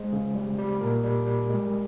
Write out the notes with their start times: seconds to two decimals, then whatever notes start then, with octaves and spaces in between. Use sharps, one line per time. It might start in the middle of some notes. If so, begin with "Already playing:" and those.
Already playing: G#3 C5
0.12 C#3
0.35 G3
0.58 G3
0.81 A#2 A#4
1.04 G3
1.27 G3
1.50 G#3